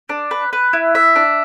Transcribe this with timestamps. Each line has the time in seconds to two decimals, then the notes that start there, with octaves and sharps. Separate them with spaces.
0.09 D4
0.31 B4
0.53 B4
0.73 E4
0.95 E5
1.16 D4